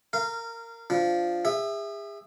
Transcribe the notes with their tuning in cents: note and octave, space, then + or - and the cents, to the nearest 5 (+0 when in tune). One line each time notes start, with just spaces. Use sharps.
A#4 -15 F5 -25
F3 +0 D4 +0
G#4 -40 E5 +0